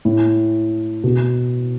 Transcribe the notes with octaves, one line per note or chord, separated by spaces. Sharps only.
A2
B2